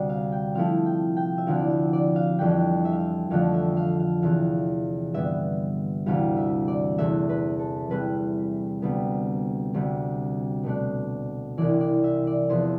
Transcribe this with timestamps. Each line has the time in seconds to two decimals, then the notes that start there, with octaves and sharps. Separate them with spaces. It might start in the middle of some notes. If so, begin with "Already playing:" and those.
Already playing: D2 C3 G3 C4 D4
0.09 F5
0.32 G5
0.54 C3 F3 A3 E4 F5
0.86 G5
1.17 G5
1.38 E5
1.47 D2 D3 F3 C4 E4 F5
1.59 D5
1.70 E5
1.93 D5
2.16 F5
2.39 F2 E3 G3 D4 G5
2.85 E5
2.93 F5
2.99 E5
3.30 F2 D3 F3 A3 F5
3.54 E5
3.77 F5
4.00 F5
4.22 E2 C3 E3 F5
5.14 G2 D3 G3 B3 E5
6.06 D2 C3 E3 G3 F5
6.37 E5
6.68 D5
6.98 E2 C3 E3 A3 E5
7.29 B4
7.59 A4
7.90 C3 E3 G3 B4
8.82 D2 C3 G3 B3
9.74 D2 C3 G3
10.64 B2 A3 D4
11.58 C2 C3 E3 D5
11.80 D5
12.04 E5
12.27 D5
12.49 E2 C3 F3 B3 E4 C5